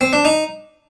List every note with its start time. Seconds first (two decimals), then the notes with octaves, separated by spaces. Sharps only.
0.01 C4
0.13 D4
0.25 D#4